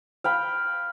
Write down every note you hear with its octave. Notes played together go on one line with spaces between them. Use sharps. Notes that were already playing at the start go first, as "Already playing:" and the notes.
F5 G5 B5